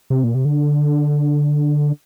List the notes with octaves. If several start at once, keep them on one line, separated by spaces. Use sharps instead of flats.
C3
A#2
C3
D3